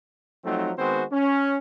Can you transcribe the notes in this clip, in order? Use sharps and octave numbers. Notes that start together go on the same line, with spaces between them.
F3 F#3 A3 C4 D#4
D#3 G#3 B3 C4 F#4 C5
C#4